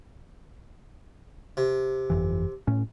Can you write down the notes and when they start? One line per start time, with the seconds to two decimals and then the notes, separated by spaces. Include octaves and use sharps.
1.57 C3
2.10 G1 F2 E3
2.67 A2 C#4